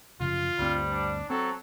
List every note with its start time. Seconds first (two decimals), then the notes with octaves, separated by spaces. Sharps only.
0.20 F#2 C#3 F3 F4
0.59 D2 G2 G3 C4
0.91 D4
1.30 F#3 C4 A4